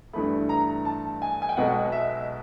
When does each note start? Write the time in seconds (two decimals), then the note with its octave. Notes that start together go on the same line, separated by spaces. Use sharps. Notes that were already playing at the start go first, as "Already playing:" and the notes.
0.13 G2 E3 A3 B5
0.49 A#5
0.85 A5
1.22 G#5
1.42 G#5
1.49 G5
1.57 B1 B2 G#3 F#5
1.92 E5